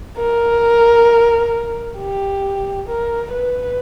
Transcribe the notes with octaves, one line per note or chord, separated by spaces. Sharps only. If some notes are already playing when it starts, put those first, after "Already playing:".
A#4
G4
A#4
B4